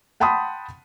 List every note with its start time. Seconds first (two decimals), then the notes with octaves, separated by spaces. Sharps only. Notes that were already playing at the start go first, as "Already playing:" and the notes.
0.20 F#5 G5 A5 B5 C6 D#6